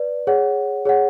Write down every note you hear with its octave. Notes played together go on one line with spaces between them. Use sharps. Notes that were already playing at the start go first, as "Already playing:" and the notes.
Already playing: B4 D5
G#4 C#5 F#5
G#4 C#5 F#5